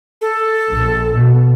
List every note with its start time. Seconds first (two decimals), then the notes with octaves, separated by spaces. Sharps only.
0.21 A4
0.69 A#1
1.17 B2